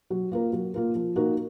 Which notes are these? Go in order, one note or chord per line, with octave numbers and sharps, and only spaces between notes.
F#3
A#3 F4 A#4
F#3
A#3 F4 A#4
F3
A#3 D#4 F#4 A#4